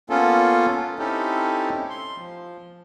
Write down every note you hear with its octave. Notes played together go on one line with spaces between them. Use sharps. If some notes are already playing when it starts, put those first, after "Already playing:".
A#3 B3 C#4 F4 A4
C4 C#4 D#4 E4 G4 A4
C6
F3